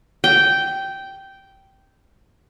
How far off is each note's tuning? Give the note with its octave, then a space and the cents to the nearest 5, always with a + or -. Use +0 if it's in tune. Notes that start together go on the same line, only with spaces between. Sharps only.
G5 -10